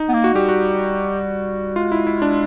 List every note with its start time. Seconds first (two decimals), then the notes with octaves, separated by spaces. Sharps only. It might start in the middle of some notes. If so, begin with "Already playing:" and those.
Already playing: D#4
0.09 B3
0.13 A#3
0.24 F#4
0.34 G3 G4
0.49 F#4
1.76 G#3 F4
1.92 E4
2.07 E4
2.22 D4